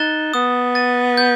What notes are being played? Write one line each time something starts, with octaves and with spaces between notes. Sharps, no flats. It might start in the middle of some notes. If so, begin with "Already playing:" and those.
Already playing: D#4 F#6 A6 E7 G7
B3 D#6
A6 D#7
G6